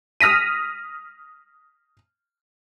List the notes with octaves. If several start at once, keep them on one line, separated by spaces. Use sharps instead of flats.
D#6 F6 A#6 B6 D#7